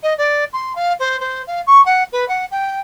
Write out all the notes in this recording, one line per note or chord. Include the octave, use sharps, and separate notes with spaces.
D#5
D5
C6
F5
C5
C5
F5
C#6
F#5
B4
F#5
G5